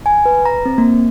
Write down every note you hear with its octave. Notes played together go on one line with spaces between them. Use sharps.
G#5
B4
A#5
C4
A#3